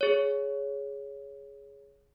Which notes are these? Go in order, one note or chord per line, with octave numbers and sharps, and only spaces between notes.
G#4 C#5